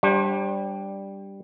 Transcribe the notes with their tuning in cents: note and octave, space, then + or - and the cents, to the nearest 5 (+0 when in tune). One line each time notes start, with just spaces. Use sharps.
G3 +0 D4 +0 C5 +40